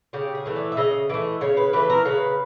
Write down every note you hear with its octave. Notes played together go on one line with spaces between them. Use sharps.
C#3 G4
G#4
E3 A3
D5
E5
C#3 D#5
E3 A3
C#3 C#5
B4
E3 A3 B4
A#4
C#3 B4